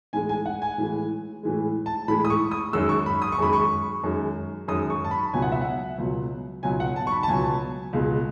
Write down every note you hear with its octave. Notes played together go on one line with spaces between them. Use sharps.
A2 E3 G#3 G#5
G#5
F#5
G#5
A2 E3 G#3
A2 E3 G#3
A5
A2 E3 G#3 B5
D#6
C#6
D#6
F#2 D#3 G#3 E6
C#6
B5
D#6
C#6
F#2 D#3 G#3 B5
C#6
F#2 D#3 G#3
F#2 D#3 G#3 D#6
C#6
A5
B5
C#2 B2 F#3 G#5
F#5
E5
F#5
C#2 B2 F#3
C#2 B2 F#3 G#5
F#5
A5
C#6
B5
A5
C#2 B2 F#3 G#5
C#2 B2 G#3